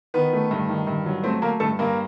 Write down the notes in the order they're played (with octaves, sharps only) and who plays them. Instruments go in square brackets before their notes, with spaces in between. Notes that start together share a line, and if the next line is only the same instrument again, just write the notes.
[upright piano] D#3 B3 B4
A3
G2
D#3
G2
F#3
A3 C4 C5
A3 A#3 A#4
G2 A3 A4
G2 A#3 A#4